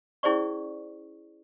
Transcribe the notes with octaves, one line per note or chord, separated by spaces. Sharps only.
C#4 E4 G#4 C5 D5 C#6